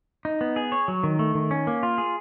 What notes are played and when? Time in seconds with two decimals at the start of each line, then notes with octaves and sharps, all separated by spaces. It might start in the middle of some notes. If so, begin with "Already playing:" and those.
0.25 D#4
0.41 B3
0.56 G#4
0.72 C#5
0.88 F#3
1.03 D#3
1.19 A3
1.35 D#3
1.51 C#4
1.67 A#3
1.83 F4
1.98 G#4